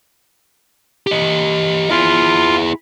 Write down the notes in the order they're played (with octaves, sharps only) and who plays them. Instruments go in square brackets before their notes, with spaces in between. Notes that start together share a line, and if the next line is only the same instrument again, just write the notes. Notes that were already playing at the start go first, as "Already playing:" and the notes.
[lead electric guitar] G4 D#5
[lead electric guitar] E4 G#4 [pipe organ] F4